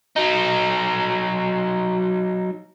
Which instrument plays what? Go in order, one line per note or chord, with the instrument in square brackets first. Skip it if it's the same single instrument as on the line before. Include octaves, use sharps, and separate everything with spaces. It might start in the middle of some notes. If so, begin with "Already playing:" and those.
[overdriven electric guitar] F#3 D#4